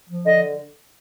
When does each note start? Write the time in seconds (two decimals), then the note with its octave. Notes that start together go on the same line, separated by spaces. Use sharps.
0.09 F3
0.26 D3 D#5